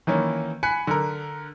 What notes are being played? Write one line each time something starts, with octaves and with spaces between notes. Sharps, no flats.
D#3 E3 A#3 C#4
G#5 B5 F#6 B6 C#7
D3 A#4